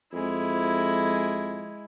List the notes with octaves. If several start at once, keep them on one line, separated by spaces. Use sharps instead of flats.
F2 G#3 E4